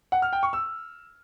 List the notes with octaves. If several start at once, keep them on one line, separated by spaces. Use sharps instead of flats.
F#5
F6
G5
C#6
E6